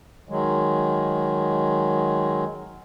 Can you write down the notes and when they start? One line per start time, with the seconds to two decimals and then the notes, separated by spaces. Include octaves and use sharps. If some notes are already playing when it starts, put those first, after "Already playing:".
0.29 D#3 F#3 G#3